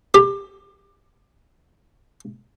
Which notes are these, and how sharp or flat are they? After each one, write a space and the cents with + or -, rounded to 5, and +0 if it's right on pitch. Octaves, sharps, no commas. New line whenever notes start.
G4 +20